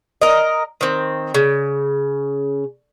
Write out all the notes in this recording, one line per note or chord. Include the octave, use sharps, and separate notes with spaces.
A#4 D#5
D#3 C4
C#3